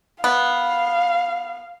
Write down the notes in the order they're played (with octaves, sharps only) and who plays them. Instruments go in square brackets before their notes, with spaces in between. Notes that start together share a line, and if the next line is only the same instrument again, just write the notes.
[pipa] B3 [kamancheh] F5